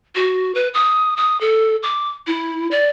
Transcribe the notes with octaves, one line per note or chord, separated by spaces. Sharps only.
F#4
B4
D#6
D#6
A4
D6
E4
D5